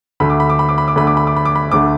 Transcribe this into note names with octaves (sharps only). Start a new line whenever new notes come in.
D2 D3 A3 B5
D6
B5
D6
B5
D6
B5
D6
D2 D3 A3 B5
D6
B5
D6
B5
D6
B5
D2 D3 A3 D6